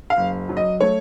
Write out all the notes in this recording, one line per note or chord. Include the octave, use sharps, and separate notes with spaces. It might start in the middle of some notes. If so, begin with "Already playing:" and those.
F5
F#1
F#3
D#5
A3 C#5